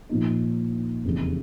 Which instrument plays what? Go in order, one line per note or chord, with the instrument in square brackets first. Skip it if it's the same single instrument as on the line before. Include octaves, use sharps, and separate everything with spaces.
[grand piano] A#2 F3 A#3 D#4
F1 E2 C#3 E3